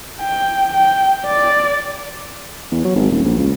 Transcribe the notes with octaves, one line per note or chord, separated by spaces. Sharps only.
G5
G5
D5
E2
F#3
G#1
D#1
A#1
C#2